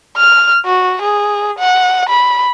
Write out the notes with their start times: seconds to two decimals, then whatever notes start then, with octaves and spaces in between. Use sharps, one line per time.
0.17 F6
0.66 F#4
1.02 G#4
1.59 F#5
2.09 B5